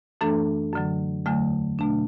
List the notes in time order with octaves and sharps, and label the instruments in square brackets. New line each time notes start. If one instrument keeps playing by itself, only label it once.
[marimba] F#2 E3 A3 D4 A4
F#2 D3 F#3
E2 D3 F#3 A3
B2 A3 D4